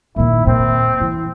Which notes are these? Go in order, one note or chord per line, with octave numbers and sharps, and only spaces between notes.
A#2 D#3 E4
A#2 C4
E3